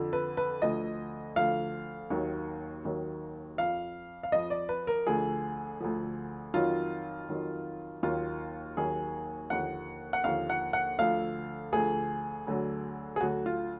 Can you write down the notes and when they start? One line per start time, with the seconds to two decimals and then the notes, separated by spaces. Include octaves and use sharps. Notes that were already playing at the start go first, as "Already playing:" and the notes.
Already playing: F2 D3 F3
0.13 B4
0.37 B4
0.62 D2 D3 F3 D#5
1.36 D2 D3 F3 F5
2.10 D#2 D#3 F#3
2.85 D#2 D#3 F#3
3.58 F2 F3 F5
4.23 F5
4.32 F2 F3 D#5
4.50 D5
4.69 B4
4.87 A#4
5.07 D2 D3 F3 G#4
5.80 D2 D3 F3
6.54 F2 D#3 F#3 F4
7.28 F2 D#3 F#3
8.02 D#2 D#3 F#3 F4
8.77 D#2 D#3 F#3 G#4
9.50 D#2 D3 F3 F#5
10.13 F#5
10.24 D#2 D3 F3 F5
10.50 F#5
10.73 F#5
10.99 D2 D3 F3 F5
11.72 D2 D3 F3 G#4
12.47 D2 D3 F#3
13.16 G#4
13.21 D2 D3 F#3 F#4
13.46 F4